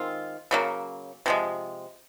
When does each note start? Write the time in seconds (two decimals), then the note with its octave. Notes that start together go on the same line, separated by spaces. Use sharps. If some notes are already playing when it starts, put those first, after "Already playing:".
Already playing: D#3 G#3 C4 F4
0.51 C#3 F#3 A#3
1.26 C3 F3 G#3